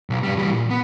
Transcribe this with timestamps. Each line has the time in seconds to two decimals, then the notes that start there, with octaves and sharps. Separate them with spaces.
0.10 B1
0.23 G2 G3
0.37 E3 G3
0.53 A#2
0.70 B3